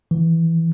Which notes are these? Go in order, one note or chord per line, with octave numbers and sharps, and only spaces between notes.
E3